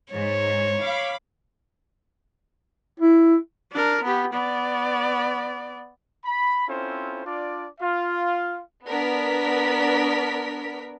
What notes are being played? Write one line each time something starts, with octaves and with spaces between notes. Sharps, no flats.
G#2 C5 C#5
F5 B5 D6
E4
D4 A#4
B3 G4
B3 D5
B5
C4 C#4 E4 F4 A4 C5
D4 F4 D5
F4 F5
B3 D4 A#4 B6